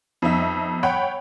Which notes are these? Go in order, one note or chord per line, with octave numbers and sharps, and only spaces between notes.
F2 B3 D#4 E5
C#5 F#5 G5 B5